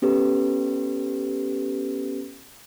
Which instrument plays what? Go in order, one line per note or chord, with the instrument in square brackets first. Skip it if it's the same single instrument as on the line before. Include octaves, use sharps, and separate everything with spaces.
[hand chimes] B3 C#4 G4 A4 B4